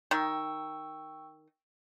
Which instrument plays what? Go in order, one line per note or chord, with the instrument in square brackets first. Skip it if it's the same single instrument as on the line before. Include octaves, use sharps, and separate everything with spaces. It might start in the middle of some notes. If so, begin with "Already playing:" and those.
[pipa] D#3 [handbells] G5 C#6 E6